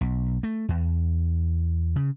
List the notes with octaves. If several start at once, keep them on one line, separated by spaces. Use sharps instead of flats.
B1
A3
E2
C#3